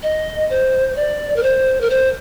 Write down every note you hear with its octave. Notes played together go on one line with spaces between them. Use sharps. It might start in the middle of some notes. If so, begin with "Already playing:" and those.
D#5
C5
D5
A#4
C5
A#4
C5